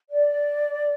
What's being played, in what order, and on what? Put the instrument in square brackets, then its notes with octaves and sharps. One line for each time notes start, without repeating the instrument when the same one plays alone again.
[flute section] D5